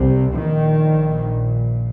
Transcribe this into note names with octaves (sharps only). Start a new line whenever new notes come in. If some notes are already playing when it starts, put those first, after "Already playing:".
Already playing: C2 C3
A#1 A#2 D#3